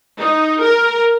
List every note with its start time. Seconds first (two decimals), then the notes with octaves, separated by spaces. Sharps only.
0.19 D#4
0.62 A#4